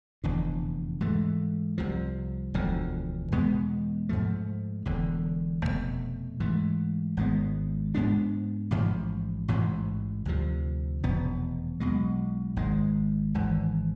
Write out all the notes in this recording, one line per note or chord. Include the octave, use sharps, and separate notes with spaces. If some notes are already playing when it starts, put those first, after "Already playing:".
F1 E2 D3
G#2 E3 A3
C2 C3 F3
E1 D2 D3 F3
E2 B2 G#3 B3
G#2 F3 A3
E1 E2 D3
F1 E2 B2 A3
G#2 E3 A3
G#1 G#2 G#3 B3
G#2 G#3 B3 D4
A1 G#2 F3
A1 G#2 E3
D2 C3 F3
F1 E2 B2 B3
B1 B2 G#3
G#1 G#2 G#3
G#1 G#2 E3